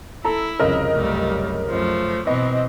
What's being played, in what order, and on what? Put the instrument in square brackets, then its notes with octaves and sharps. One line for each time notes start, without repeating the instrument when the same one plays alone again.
[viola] E4 [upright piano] A4 A#5
[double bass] C2 F2 [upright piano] C#3 [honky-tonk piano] A#4 D#5
[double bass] C2 F#2 [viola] G3 A3
[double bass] F#2 [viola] F3 A3
[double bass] B2 [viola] E3 C4 [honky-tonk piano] D#5